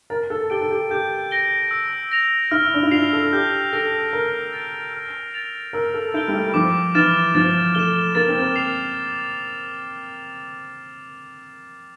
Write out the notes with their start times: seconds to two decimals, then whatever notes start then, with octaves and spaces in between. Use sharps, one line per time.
0.10 A#4 A6
0.30 A4
0.50 G4 D7 G7
0.61 A4
0.71 G4
0.91 G4 G6
1.31 A#6 D7 G7
1.71 E6
2.12 A#6 F7
2.51 E4 F6
2.74 D4
2.83 E4
2.91 F4 C7 F7
3.13 A4
3.33 G4 G6
3.72 A4 A#6 D7
4.13 A#4 F6
4.53 A6 D7 F7
4.93 F6
5.34 A6 D7 F7
5.73 A#4 E6
5.94 A4
6.14 E4 G6 D7 G7
6.28 G3
6.35 A3
6.54 F3 D6
6.95 E3 F6 A6 E7
7.35 F3 A6
7.75 A3 E7 G7
8.15 A#3 A6
8.28 C4
8.42 A#3
8.56 C7 F7